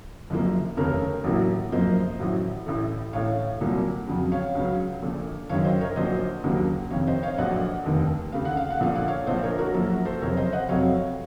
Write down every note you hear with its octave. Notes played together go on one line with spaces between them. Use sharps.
F#1 F#2 F3 A#3
F1 D#2 C#3 A3 A#4 C#5
A1 A2 F#3 A#3
F#1 F#2 F3 A#3 C5 D#5
A1 A2 F#3
A1 A2 A3
A1 A2 A3 C#5 F5
C2 A#2 F#3 A#3
F2 C#3 F#3
C#5 F5
C#2 C#3 F#3
A#1 A#2 A3
F#1 F#2 D#3 C#5 F5
C5 D#5
A#4 C#5
A#1 A#2 F#3 C5 D#5
D#2 C#3 F#3 A#3
F2 C3 D#3 C#5 F5
C5 D#5
C#5 F5
A#1 A#2 F#3 A3 D#5 F#5
F1 D#2 D#3
D#2 C#3 A3 F5
F#5
F5
F#5
A#1 A#2 A3 F5
F#5
C#5 F5
A#1 A#2 F3 C5 D#5
A#4 C#5
F#4 A#4
F#2 F3 A#3 A4
F#4 A#4
A4 C5
F#1 F2 C3 A#4 C#5
C5 D#5
D#5 F#5
F2 C3 F#3 A3 C#5 F5